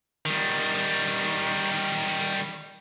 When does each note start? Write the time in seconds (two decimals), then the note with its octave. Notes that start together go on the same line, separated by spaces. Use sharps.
0.26 D#3 G3